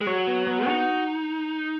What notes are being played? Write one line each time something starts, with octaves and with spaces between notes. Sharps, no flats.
G#3
F#3 C#5
B3
B3
D#4 F#4